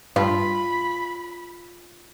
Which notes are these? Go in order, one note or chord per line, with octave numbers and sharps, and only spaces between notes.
G2 F4 B5